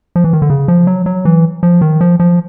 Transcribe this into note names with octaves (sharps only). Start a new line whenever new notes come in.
F3
E3
D#3
D3
C#3
F3
F#3
F#3
E3
F3
D#3
F3
F3